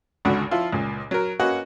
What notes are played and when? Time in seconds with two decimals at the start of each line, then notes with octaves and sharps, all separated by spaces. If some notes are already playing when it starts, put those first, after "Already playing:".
0.25 G#1 C#2 D3 F#4 B5
0.51 F3 E4 F4
0.72 C#2 A#2
1.11 F#3 A#4
1.39 A#3 C#4 F#4 B4 D#5 F#5